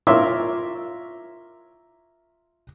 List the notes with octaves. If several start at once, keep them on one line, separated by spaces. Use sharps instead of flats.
F4 A#4 C#5 E5 C6 D6